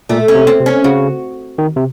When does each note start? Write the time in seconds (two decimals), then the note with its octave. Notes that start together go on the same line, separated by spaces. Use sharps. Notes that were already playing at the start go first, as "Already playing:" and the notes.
0.09 A#2 A3
0.28 C#4
0.35 C3
0.47 C4
0.60 C3
0.66 C#4
0.84 C#3 F#4
1.58 D#3
1.76 C3